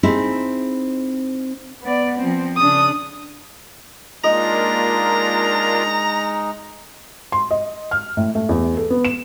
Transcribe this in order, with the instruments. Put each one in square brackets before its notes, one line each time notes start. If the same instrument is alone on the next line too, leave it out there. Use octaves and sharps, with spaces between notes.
[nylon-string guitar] C4 D#4 E4 G#4
[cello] B3 D5
F3 C4
[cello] C#3 D4 [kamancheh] D#6
[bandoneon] G#3 D#4 [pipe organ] A#3 D4 F4 [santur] D#5 [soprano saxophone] A#5
[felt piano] C6
D#5
F6
A2
A3
E2
A4
B3
E7